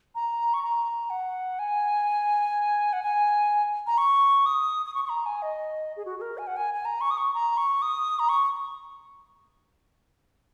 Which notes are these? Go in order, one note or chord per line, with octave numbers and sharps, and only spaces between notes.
A#5
C#6
A#5
F#5
G#5
F#5
G#5
A#5
C#6
D#6
D#6
C#6
C#6
A#5
G#5
D#5
G#4
F#4
G#4
A#4
G#5
F#5
G#5
G#5
A#5
C#6
D#6
C#6
A#5
C#6
D#6
A#5
C#6